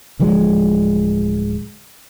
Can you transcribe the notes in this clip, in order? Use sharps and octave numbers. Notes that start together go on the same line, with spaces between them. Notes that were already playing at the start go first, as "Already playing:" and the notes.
D1 D3 F3 G#3